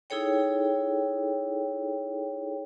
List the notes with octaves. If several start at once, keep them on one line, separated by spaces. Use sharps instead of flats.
D#4 E4 G#4 A4 C#5 G5